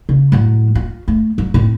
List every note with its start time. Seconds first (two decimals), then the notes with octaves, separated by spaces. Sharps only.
0.09 C#3
0.32 A2 F#3
0.75 F4
1.08 A3
1.38 F#3
1.54 A2 C4